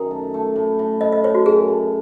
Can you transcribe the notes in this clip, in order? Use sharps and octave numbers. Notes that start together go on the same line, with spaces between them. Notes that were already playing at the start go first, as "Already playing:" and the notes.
Already playing: F#2 D#3
A3
A3
A2
A2
A2 D#5
D#5
A2 C#5
F#4
F#2 G#4
A3